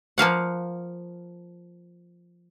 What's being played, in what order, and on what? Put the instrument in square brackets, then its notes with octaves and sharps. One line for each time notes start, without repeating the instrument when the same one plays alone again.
[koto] F3 A#3 F5 F#5